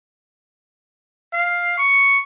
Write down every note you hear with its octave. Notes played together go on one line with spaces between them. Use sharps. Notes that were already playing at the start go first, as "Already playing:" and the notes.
F5
C#6